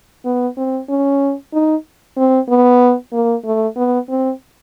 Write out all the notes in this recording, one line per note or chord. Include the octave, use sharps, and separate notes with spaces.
B3
C4
C#4
D#4
C4
B3
A#3
A3
B3
C4